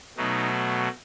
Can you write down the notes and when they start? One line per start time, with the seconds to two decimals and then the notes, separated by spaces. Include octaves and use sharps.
0.17 B2 F#3 A3 D#4